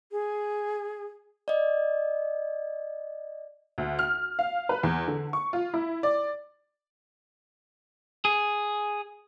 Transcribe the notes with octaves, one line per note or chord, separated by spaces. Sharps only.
G#4
D5 D#5
D2
F6
F5
B4
E2
D3
C#6
F4
E4
D5
G#4